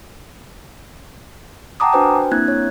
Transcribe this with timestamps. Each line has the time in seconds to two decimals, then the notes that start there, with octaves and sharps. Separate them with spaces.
1.80 F#5 G5 A5 A#5 D6 D#6
1.93 D4 F#4 B4 C5 G5 G#5
2.31 A#3 C4 D4 E4 F#6 G#6
2.48 C#5